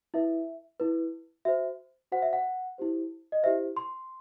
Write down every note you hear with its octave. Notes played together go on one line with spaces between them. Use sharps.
E4 B4 E5
E4 B4
F#4 C5 E5
F#4 C5 F#5
E5
F#5
E4 G4 C5
D#5
E4 G4 C5 E5
C6